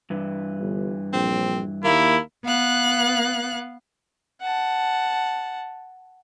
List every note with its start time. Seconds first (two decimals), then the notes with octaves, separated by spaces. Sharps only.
0.10 G2 E3
0.59 G1
1.13 A#1 C4
1.84 D#2 A#3 E4
2.44 B3 F5 F#6
4.41 F#5 A5